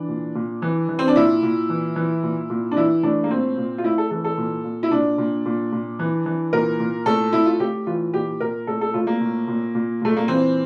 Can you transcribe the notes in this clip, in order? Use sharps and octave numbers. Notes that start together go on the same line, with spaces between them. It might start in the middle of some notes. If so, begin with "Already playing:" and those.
Already playing: E3 D4
A#2
A#2
E3
E3
C4
D4
A#2 E4
A#2
E3
E3
A#2
A#2
D4
E3 E4
A2 D4
A#3
A#2 C4
A#2
F4
A2 E4
A4
E3 A4
A4
A#2
A#2
E4
A#2 D4
A#2
A#2
A#2
E3
E3
A#2 A#4
A#2
A2 A4
A2 E4
F4
A2 G4
E3 F4
A#2 G4
A#2 A#4
A2 A4
A4
A2 F4
A#3
A#2
A#2
A#2
A#2 A3
A#3
E3 C4